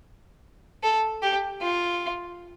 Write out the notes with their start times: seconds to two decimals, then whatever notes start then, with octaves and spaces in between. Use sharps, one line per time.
0.83 A4
1.22 G4
1.62 F4